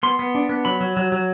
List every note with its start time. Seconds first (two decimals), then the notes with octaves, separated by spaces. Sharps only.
0.03 B3 C6
0.19 B3
0.35 D4
0.49 B3
0.65 F#3 B5
0.81 F#3
0.97 F#3
1.12 F#3